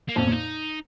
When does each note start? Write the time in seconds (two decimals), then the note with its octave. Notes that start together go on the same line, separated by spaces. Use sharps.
0.09 A#3
0.16 F2 A#2 C#4
0.27 A#2
0.32 D#4